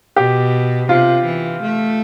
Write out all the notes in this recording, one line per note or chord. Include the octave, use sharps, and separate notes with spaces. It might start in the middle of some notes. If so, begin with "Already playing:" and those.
B2 G4
C3 F4
E3
A3